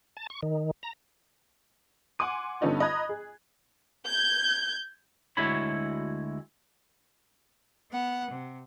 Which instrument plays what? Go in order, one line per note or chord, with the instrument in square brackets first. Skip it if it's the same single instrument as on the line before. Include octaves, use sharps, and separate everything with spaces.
[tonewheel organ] A5
C#6
D#3
A#5
[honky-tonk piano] F#5 G#5 C6 D6 D#7
G2 D3 B3 C#4 D#4 F4
D#5 A#5 B5 F#6 G#6
G#4
[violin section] G6 G#6
[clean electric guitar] D2 G#3 E4 F#4 C#5 B5
[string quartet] B3 F#5
C3